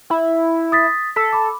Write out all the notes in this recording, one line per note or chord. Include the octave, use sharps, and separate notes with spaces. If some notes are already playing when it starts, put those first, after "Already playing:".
E4
D#6 A6 B6
A4 B6
B5 D6